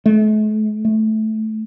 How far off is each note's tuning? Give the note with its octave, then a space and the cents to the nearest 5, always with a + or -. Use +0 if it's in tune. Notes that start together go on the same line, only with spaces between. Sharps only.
A3 -45
A3 -10